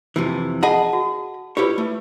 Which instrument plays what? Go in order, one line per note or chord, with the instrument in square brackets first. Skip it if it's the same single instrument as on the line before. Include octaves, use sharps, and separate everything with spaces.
[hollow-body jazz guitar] F2 C3 E3
[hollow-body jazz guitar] G#4 D#5 B5 [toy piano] F#5 A5
[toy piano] F#4
[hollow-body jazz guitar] E4 G4 C#5 [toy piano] F4 B4
[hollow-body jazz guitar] A3